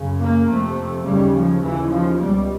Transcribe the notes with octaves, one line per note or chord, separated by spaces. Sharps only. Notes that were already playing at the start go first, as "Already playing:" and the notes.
Already playing: F#2 C#3
A#3
F2 C3 A3
D#2 C#3 G3
F3
D#2 C#3 E3
F3
C#2 B2 G3